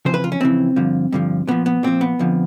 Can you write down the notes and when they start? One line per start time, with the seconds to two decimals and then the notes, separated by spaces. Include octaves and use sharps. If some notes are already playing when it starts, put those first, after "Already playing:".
0.05 F2 C#3 E3 C5
0.14 B4
0.24 F4
0.32 C#4
0.41 F2 C#3 E3 C4
0.76 G2 D3 F3
1.12 G2 D3 F3
1.47 A#2 F3 B3
1.66 B3
1.83 A#2 F3 C4
2.01 B3
2.19 F2 D3 F3